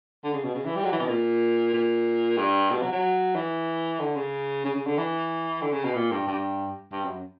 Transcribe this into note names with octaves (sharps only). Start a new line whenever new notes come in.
D3
C#3
B2
C#3
E3
G3
F#3
E3
B2
A#2
A#2
G2
B2
F#3
F#3
E3
D3
C#3
C#3
C#3
D3
E3
D3
C#3
B2
A#2
G2
G2
G2
F#2